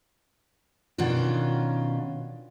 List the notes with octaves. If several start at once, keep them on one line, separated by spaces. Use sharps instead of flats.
B2 D#3 C#4 D4 F4